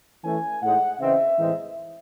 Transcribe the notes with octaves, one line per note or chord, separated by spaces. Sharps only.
E3 A3 C#4 G#5
A2 G#3 D#4 F#5
C#3 E3 C4 D#4 E5
A2 E3 G#3 C4 D#4